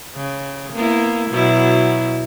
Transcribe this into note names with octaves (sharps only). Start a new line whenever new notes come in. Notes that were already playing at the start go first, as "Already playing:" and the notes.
C#3
A#3 B3 E4
B2 F#3 E4